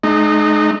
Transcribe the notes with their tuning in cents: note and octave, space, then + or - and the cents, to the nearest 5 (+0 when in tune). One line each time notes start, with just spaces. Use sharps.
G#3 +40 D#4 -30